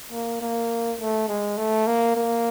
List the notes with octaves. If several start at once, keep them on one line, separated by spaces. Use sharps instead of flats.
A#3
A#3
A3
G#3
A3
A#3
A#3